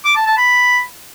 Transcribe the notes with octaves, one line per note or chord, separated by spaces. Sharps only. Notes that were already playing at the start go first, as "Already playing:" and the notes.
D6
A5
A5
B5